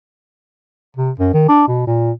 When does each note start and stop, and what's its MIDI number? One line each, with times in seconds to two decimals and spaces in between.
0.97 1.11 48
1.19 1.30 42
1.34 1.46 51
1.49 1.65 62
1.68 1.83 47
1.87 2.11 46